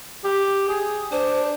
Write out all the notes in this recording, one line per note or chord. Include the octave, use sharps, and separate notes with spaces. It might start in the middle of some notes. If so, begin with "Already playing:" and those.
G4
G#4
D4 C5